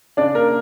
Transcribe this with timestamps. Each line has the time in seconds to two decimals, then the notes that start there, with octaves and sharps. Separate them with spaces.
0.17 C#3 D4 D5
0.34 A#3 A#4